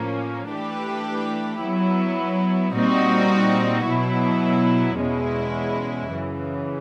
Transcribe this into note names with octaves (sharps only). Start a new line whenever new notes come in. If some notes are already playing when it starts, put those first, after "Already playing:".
Already playing: A2 F3 A#3 C#4
E3 A3 D4 G4 B4
F#3 B3 E4
A#2 G3 C4 D#4 F#4
B2 F#3 B3 E4
E2 B2 G#3 C#4 E4
F#2 C#3 E3